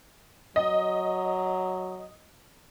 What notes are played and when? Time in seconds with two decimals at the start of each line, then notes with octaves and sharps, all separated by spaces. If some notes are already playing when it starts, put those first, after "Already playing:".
0.56 F#3 D#5